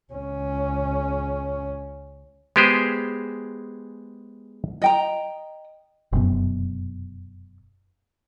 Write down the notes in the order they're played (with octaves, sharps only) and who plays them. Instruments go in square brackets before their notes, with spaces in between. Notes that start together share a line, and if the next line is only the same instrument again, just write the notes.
[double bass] C#2 C#4
[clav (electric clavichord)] G#3 B3 G4 G#4 C5
[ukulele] D#5 G5 A#5
[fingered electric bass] F1 F#2 B2